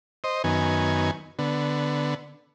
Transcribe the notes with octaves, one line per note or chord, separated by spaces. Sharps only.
C5 D#5
F#2 D#3 B3 G#5
D3 B3